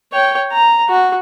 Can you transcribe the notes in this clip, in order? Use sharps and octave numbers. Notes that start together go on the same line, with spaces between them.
C#5 G5
A#5
F#4